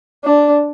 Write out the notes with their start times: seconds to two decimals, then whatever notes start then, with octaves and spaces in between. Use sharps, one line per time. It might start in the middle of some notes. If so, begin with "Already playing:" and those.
0.25 D4